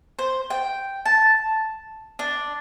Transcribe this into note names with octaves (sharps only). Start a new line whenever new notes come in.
C5
G5
A5
D4